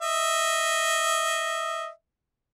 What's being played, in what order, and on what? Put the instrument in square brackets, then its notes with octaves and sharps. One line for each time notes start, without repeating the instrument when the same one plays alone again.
[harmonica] D#5 E5